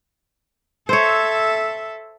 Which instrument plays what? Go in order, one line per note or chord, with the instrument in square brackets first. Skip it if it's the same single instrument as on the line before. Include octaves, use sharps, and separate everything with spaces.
[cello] A4 E5 [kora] C5 C#5